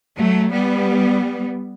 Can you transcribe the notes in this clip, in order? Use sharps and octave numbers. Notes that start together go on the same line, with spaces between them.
F#3 A3
G3 B3